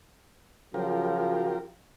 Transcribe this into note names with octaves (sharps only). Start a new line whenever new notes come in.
C#3 F3 F#3 F4 G4 A#4